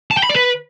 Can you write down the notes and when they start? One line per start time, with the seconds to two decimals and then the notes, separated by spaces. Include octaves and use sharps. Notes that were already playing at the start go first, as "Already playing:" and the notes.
0.11 A5
0.17 G5
0.23 B5
0.29 D5
0.36 B4